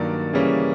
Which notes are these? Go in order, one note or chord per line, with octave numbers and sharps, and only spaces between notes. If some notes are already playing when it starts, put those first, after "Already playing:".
Already playing: G2 D#3 F#3 A#3 D5
C#3 E3 G3 A#3 C#4